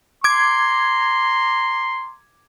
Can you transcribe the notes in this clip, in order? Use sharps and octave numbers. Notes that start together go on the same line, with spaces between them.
A#5 C6 D6 G#6